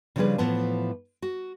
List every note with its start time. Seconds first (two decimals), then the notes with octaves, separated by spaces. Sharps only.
0.16 C#3 F3 G3 D4 G#4 B4
0.38 A2 E3 F3 B3 A5
1.22 F#4